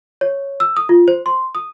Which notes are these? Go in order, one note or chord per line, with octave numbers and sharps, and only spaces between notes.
C#5
E6
D#6
F4
C5
C6
D#6